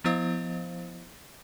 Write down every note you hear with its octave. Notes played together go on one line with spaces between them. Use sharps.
F3 B3 E4 C5 D#5 F5